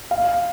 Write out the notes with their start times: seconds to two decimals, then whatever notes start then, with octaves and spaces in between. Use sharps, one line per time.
0.11 F5